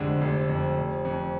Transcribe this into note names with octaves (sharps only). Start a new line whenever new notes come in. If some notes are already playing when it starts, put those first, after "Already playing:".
Already playing: F1 F2 D3 G#3
F1
F2
F1
F2